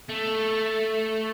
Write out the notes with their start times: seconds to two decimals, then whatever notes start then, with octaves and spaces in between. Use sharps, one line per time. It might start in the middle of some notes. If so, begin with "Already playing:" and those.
0.09 A3